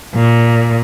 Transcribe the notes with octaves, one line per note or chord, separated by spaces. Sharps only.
A#2